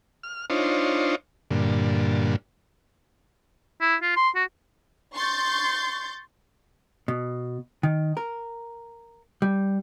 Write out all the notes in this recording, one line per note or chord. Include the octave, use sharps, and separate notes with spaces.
F6
D4 D#4 F4 C5 C#5
G2 A#2 D3
E4
F4
C6
F#4
C6 C#6 G6 A6
B2
D#3
A#4
G3